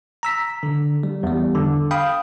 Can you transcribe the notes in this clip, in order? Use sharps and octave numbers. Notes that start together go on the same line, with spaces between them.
A#5 E6 B6
D3
G3
E2 G3
D3
F5 G5 B5 D#6